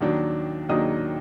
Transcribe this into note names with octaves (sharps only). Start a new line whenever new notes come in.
D#2 D#3 F#3 D4
D#2 D#3 F#3 D4 D#5 D#6